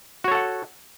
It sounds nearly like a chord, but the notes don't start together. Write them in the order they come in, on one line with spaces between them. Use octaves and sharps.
F#4 C#5 A4 F#5